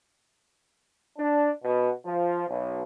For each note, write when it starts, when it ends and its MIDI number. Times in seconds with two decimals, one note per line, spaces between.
1.17 1.49 62
1.63 1.90 47
2.05 2.46 53
2.48 2.83 35